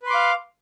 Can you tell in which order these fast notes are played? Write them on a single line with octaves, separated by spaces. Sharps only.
B4 C6 D6 F5